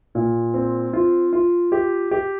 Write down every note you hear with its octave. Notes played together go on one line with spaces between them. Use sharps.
A#2
C4
F4
F4
G4
G4